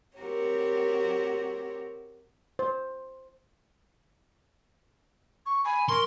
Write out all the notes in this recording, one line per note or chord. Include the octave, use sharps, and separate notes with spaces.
C4 F#4 G4 A#4 C#5
C5
C#6
G#5 B5
A#4 C6 C#6